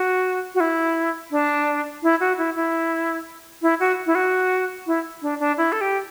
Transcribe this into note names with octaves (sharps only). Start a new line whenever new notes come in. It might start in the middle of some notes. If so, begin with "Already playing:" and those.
Already playing: F#4
F#4
E4
D4
E4
F#4
E4
E4
E4
F#4
E4
F#4
E4
D4
D4
E4
A4
G4